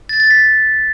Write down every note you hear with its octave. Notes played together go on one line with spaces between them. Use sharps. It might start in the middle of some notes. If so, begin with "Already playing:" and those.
A6
A6
B6